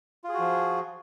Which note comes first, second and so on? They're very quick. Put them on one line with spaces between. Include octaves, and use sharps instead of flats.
F4 G#4 F#4 F3